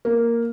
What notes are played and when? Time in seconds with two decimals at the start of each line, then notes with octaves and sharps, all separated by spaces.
0.05 A#3